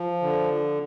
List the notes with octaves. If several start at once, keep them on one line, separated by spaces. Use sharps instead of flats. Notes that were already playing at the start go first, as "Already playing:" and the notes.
Already playing: F3
D3